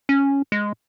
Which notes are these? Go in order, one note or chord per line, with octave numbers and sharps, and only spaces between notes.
C#4
G#3